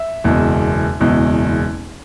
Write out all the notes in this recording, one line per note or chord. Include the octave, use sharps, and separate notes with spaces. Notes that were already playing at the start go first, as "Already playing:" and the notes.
Already playing: E5
F#1 E2 B2 G#3
F#1 E2 B2 G#3